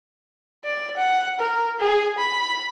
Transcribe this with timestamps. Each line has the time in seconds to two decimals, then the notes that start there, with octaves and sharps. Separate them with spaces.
0.65 D5
0.97 F#5
1.40 A#4
1.80 G#4
2.18 B5